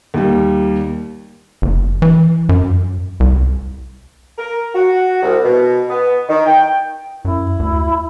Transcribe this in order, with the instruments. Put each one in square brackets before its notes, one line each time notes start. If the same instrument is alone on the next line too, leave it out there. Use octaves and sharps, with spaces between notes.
[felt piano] D#2 G3
[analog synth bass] F#1
E3
F#2
C2
[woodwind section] A#4
F#4
C2
B2
B3
D#3
G5
[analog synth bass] F#2 [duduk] E4
[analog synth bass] D2